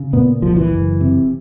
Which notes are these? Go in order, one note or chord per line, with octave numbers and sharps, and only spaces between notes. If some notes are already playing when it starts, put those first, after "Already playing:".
Already playing: C#3
A#2 B3
C2 F3
E3
F#1
C3